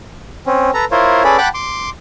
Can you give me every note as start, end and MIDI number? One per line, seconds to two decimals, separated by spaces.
0.46 0.71 60
0.46 0.71 61
0.74 0.85 69
0.74 0.85 71
0.74 0.85 82
0.92 1.23 64
0.92 1.23 65
0.92 1.23 70
0.92 1.23 72
0.92 1.23 73
1.24 1.37 61
1.24 1.37 68
1.24 1.37 69
1.24 1.37 71
1.24 1.37 74
1.24 1.37 83
1.38 1.48 78
1.38 1.48 79
1.38 1.48 81
1.38 1.48 83
1.38 1.48 86
1.38 1.48 90
1.54 1.90 84
1.54 1.90 86